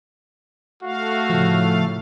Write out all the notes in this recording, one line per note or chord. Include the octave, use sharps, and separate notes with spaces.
A3 F#4 F5
A2 C#3 F3